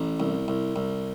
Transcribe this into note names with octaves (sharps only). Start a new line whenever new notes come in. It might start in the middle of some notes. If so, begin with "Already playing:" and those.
Already playing: A1
C2
C2
C2